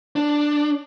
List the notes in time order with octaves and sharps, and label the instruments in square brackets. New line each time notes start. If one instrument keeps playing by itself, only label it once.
[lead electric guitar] D4